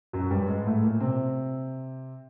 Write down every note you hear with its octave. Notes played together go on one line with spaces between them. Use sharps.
F#2 F#3
G2 G3
G#2 G#3
A2 A3
A#2 A#3
C3 C4